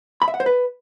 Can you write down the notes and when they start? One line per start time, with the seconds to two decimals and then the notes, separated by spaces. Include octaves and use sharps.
0.22 B5
0.28 E5
0.34 F#5
0.40 C5
0.46 B4